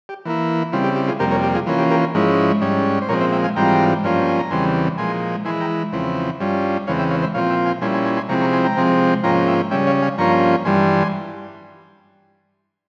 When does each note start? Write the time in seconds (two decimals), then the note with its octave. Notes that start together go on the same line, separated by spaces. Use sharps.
0.09 G4
0.25 E3 A#3 E4
0.72 C#3 G3 C4 E4 F4
0.84 G4
0.96 G4
1.08 F4 G#4
1.19 F2 C3 G3 A#3 G4 A#4
1.31 A#4 C#5
1.43 G4
1.55 F4 G#4
1.67 E3 A#3 C#4 F4
1.79 G4
1.91 G4 A#4
2.14 G#2 F3 G#3 C#4 E4
2.61 G#2 G3 C#4
3.02 C5
3.09 A#2 F3 G#3 C4 A#4 C#5
3.21 C5 E5
3.32 E5 G5
3.44 F5 G#5
3.56 G#2 E3 G3 C4 F4 G5 A#5
4.04 G2 F3 A#3 C#4 F4
4.28 G#5
4.39 A#5
4.50 E2 C#3 E3 G3 C4 G#5 C6
4.98 A#2 F3 G#3 G#5 C6
5.45 E3 G#3 E4 G#5 C6
5.61 G5 A#5
5.93 E2 C#3 F3 C4 E4
6.40 G2 G3 C#4 F4
6.87 E2 C#3 E3 G#3 C4 C#5 F5
6.99 E5 G5
7.11 C#5 F5
7.22 C5 E5
7.34 A#2 F3 C4 F4 C#5 F5
7.50 E5 G5
7.65 F5 G#5
7.81 A#2 G3 C#4 E4 G#5 C6
7.94 G#5 C6
8.06 G#5 C6
8.17 G#5 C6
8.29 C3 F3 G#3 C4 E4 A#5 C#6
8.41 A#5 C#6
8.53 G#5 C6
8.64 G5 A#5
8.77 C3 F3 G#3 C4
9.23 G#2 F3 A#3 C#4 F4 G5 A#5
9.47 E5 G5
9.71 C#3 G3 C#4 E5 G5
9.87 C#5 F5
10.02 F5 G#5
10.18 G2 F3 A#3 C#4 F4 A#5 C#6
10.65 G2 E3 G3 G#5 C6